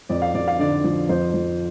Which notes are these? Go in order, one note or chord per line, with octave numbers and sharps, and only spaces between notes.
F2 D5
F5
F2 D5
F5
D3 D5
F3
F2 C5
F3